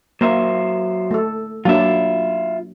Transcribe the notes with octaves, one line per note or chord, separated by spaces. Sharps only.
F#3 A#3 C5 E5
A3 A4
F#3 A#3 D4 F4 E5